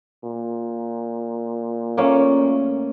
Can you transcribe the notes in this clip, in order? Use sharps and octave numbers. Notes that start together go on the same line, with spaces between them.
A#2
A3 A#3 C#4